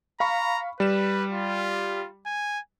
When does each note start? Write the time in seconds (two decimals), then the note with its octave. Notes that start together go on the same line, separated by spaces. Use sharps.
0.20 F5 A#5 B5 C#6
0.80 G3 B4 E7
1.31 F4
2.26 G#5